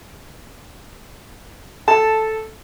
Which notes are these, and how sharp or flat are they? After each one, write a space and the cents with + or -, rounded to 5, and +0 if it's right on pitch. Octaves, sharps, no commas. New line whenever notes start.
A4 -5 A5 +0